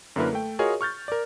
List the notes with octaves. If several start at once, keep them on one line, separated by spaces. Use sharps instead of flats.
F#2 D3 A#3 E4 A#4 B4
A3 G5
F4 F#4 G#4 A#4 C#5 D#5
C#6 F6 G6 A6
A#4 D5